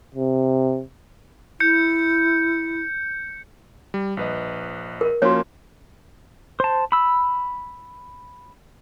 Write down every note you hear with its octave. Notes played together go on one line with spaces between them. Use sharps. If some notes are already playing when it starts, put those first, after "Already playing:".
C3
E4 G6 C#7
G3
A#1 B4 D#5
A#4
F3 A#3 C#4 F#4 C#5
C5 A5
B5 E6